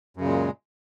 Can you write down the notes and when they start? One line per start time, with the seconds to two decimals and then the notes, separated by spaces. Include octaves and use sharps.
0.16 F#2
0.20 C#3
0.24 A#2
0.28 G#3